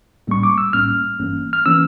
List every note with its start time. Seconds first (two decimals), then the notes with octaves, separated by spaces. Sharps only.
0.27 A#1 A2 G3 A#3 C#4 C#6
0.43 D6
0.58 E6
0.73 A#1 A2 G3 A#3 C#4 F6
1.19 G1 G2 E3 A#3 C#4
1.53 F6
1.66 E3 A#3 C#4 E6